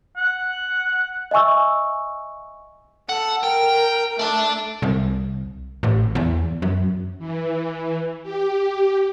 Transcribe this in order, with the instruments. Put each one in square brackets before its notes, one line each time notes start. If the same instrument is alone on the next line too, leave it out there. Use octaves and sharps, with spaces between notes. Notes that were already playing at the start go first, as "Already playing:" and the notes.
[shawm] F#5
[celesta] D#5 E5 G#5 C#6 E6
[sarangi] A4 [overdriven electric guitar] F#5
[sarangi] A#4 [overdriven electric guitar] G5
[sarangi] A3 [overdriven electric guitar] D5 A5
[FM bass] C2
A1
E2
F#2
[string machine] E3
G4